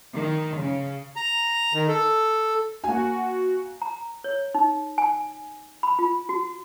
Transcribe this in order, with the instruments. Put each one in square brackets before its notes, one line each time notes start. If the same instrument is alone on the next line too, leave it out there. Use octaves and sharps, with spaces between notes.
[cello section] D#3
C#3
[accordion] A#5
D#3
A4
[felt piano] A#3 G#5 [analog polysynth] F#4
[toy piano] A#5
C#5
D#4
G#5
B5
F4
F#4